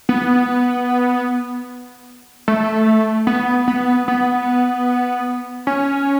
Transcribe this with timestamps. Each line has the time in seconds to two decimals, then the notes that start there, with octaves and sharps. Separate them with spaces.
0.09 B3
2.48 A3
3.27 B3
3.68 B3
4.08 B3
5.67 C#4